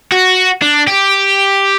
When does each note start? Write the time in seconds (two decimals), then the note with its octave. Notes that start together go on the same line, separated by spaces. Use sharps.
0.12 F#4
0.62 D4
0.88 G4